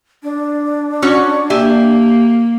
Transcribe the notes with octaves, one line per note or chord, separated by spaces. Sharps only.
D4
C#4 F#4 C#5
A#3 G4 E5 G#5